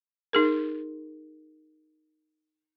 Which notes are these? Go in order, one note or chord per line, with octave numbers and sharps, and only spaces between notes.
D#4 G#4 A#4